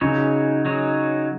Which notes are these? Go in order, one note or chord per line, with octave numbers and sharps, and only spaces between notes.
C#3 F#3 D#4 G#4 C#5
F#3 D#4 G#4 C#5